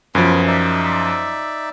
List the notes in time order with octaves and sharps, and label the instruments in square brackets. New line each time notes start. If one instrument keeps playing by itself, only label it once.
[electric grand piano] F#2 F3 [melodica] B3 G#5
[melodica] D#4 D5 E5